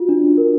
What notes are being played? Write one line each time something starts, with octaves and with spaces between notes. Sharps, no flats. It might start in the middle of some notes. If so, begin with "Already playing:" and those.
Already playing: F4 F#4
D4
D4
A#4